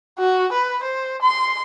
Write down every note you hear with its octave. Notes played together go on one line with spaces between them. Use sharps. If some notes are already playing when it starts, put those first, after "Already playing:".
F#4
B4
C5
C6